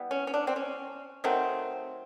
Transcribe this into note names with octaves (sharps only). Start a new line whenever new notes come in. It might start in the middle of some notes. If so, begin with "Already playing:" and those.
Already playing: E3 G3 B3
C#4
C#4
D4
C4
C#4
D#3 F#3 A3 C4